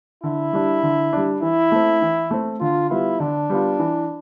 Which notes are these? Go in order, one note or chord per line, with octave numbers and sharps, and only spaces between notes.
D3 E4
G3 D4
D3
G3 D4
E3 E4
A3 C4
E3
A3 C4
D3 F4
G3 B3 E4 F4
D3 D4
G3 B3 F4
E3